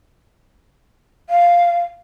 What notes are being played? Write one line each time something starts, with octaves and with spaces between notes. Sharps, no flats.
F5